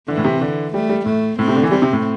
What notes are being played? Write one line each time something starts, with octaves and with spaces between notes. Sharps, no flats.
D3 E3
A2
C3
D3
G3 A3
G3
A2 A3
A2 C4
C3
D3
E3
G3 C4
C3
A2